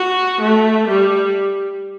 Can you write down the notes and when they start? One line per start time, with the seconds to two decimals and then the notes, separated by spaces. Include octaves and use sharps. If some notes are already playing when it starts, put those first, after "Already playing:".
Already playing: F#4
0.41 A3
0.89 G3